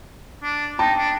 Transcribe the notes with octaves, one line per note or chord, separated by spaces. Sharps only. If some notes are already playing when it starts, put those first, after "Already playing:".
D4
D#4 G5 A5
D4